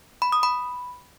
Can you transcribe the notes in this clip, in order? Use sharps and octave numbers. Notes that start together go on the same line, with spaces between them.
B5
D#6
B5